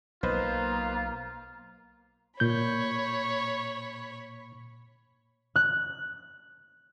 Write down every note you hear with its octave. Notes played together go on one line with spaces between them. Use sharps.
B1 A#3 F4 B4 C5 D#5
A#2 C#5 B5 G6
F#6